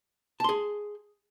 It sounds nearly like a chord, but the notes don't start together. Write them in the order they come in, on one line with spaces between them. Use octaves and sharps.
A5 C6 G#4